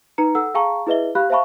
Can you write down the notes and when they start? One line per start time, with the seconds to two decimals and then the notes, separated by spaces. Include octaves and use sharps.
0.18 D#4 B4 A#5 C#7
0.35 A4 F#5 E6
0.54 G#4 F5 G5 A5 A#5 C#6
0.87 E4 G#4 B4 D#5 E5 G7
1.15 G4 F5 B5 F#6
1.30 C5 E5 F5 A5 B5 C#6